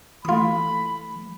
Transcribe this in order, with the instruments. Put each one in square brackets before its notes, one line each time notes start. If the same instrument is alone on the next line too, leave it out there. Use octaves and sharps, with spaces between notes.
[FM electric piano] E3 A3 [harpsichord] F4 D#6 [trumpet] B5